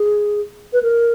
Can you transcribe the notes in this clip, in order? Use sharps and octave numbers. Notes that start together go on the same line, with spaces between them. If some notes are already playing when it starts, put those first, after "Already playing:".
Already playing: G#4
B4
A#4